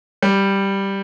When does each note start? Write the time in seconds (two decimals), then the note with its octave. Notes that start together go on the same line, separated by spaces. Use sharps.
0.22 G3